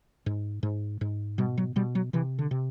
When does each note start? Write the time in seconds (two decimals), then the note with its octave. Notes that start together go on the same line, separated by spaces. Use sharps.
0.26 G#2
0.63 G#2
1.01 G#2
1.38 B2 G3
1.58 F#3
1.76 B2 G3
1.95 F#3
2.13 C3 E3
2.39 D3
2.51 C3